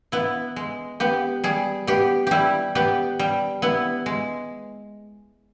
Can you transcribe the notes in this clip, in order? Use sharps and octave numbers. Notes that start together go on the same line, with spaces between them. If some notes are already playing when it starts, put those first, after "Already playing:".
B3 E4
G#3
B3 G4
G3 G#4
B3 G4
G3 E4 G4
B3 G4
G3
B3 E4
G#3